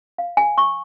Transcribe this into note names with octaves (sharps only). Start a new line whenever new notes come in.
F5
G#5
C#6